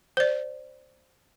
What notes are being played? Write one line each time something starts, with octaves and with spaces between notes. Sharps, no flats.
C5 D5